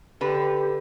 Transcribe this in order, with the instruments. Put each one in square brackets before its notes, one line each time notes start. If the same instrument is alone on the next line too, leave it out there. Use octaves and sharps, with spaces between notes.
[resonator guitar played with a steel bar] D3 B4 [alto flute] G4